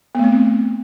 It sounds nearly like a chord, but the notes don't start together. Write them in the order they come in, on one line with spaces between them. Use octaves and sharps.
B3 A3 C4